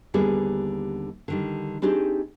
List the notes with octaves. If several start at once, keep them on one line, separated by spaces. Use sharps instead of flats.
D#2 D3 G3 B3 G#4
D3 D#3 G3
C4 D4 D#4 G4 G#4